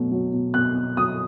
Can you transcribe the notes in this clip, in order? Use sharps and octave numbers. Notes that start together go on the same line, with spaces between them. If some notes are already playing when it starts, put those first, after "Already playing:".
Already playing: B2 F#3 A3
F#3
B2
B2 F#6
B2
F#3 D#6